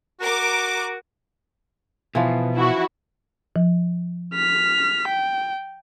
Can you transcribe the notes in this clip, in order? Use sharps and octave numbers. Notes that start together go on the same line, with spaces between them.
F#4 A#4 D6
B2 E3 F3
E4 F#4
F3
F6 B6
G5